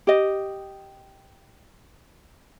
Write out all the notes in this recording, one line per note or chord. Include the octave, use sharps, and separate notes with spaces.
G4 D#5